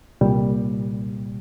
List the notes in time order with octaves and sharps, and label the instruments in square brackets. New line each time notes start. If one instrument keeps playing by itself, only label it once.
[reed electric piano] C2 A#2 G3